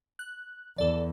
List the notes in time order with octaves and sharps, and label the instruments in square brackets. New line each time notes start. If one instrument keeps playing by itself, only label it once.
[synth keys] F#6
[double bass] E2 [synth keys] A4 D5